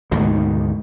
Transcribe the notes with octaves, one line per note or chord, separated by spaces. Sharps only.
D2 G#2 B2 D#3